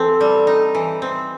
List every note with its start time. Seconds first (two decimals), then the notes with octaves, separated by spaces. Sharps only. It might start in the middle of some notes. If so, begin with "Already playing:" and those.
Already playing: E3 C4 A4
0.21 G3
0.47 D#4
0.75 E3
1.02 C4